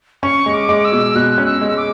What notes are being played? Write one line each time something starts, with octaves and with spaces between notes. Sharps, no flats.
C#4 C#6
G#3
D6
G#3
E6
B2
B2 F#6
C#4
E6
G#3
E6
D6